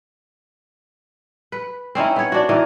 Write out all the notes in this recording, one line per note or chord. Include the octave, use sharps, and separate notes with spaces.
B4
C4 C#4 D#4 E4
B3 C#5
D4 F#4
D#3 E3 D#4